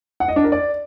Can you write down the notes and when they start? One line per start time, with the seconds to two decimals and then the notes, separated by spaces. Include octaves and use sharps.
0.20 F#5
0.28 D#5
0.36 D4
0.44 A#4
0.52 D5